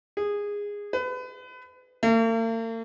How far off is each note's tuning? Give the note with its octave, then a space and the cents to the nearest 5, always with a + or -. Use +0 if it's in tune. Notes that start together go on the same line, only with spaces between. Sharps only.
G#4 -15
B4 +30
A#3 -45